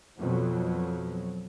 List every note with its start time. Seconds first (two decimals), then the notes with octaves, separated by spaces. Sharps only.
0.20 F2 B2 F#3